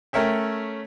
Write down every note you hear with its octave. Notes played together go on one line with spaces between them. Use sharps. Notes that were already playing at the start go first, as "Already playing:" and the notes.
A3 C#4 A#4 C#5 E5 G5